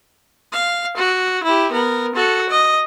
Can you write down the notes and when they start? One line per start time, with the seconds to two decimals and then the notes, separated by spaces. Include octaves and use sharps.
0.53 F5
0.97 F#4
1.44 E4 G4
1.72 B3 A#4
2.15 F#4 A4
2.50 D#5